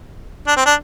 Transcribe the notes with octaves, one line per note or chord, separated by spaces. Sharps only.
D4
C4
D4